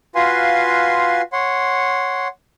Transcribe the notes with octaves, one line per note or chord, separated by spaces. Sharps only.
F4 F#4 B4 F5 G#5 C6
C#5 F#5 C6